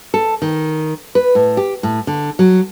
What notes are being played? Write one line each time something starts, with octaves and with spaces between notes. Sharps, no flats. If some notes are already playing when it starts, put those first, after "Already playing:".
A4
D#3
B4
A2
G4
A2
D3
F#3